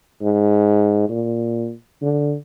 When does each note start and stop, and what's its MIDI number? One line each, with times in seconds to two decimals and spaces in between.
0.22 1.06 44
1.09 1.71 46
2.02 2.35 50